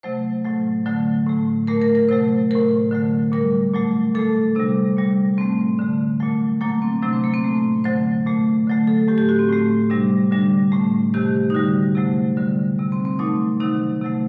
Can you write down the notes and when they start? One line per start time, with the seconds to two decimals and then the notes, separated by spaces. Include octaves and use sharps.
0.03 C3 F#3 A3 C5
0.44 A2 F#3 A3
0.86 D3 F#3 A3
1.26 A2 A3
1.67 A#2 A3 A#4
1.81 A#4
1.95 A#4
2.09 C3 F#3 A3 C5
2.51 A2 A3 A#4
2.91 D3 F#3 A3
3.32 A#2 G3 A#4
3.74 A#2 F#3 A3
4.15 A#2 A3 A4
4.55 C3 G3 D4
4.97 A#2 G3
5.37 A2 A3 C4
5.79 D3 A3
6.20 A#2 F#3 A3
6.61 A#2 F#3 A3 A#3
6.82 C4
7.02 C3 F#3 A3 D4
7.13 C4
7.24 A#3
7.34 C4
7.44 A2 A3
7.84 D3 F#3 A3 C5
8.26 A#2 A3
8.67 D3 F#3 A3
8.87 A4
9.08 A2 A3 G4
9.18 G4
9.29 F#4
9.39 C4
9.49 A2 A3
9.90 C3 G3 D4
10.31 D3 G3 D4
10.72 A2 A3
11.14 C3 D#3 A3 G4
11.50 D#4
11.54 D3 G3 F#4
11.95 C3 F#3 A3
12.37 D3 G3
12.79 C3 G3
12.92 C4
13.05 C4
13.19 A#2 F#3 A3 D#4
13.60 C3 D#3 F#3 D#4
14.02 C3 F#3 A3